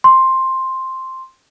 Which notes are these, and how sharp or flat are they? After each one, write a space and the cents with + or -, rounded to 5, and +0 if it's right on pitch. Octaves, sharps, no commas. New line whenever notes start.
C6 +5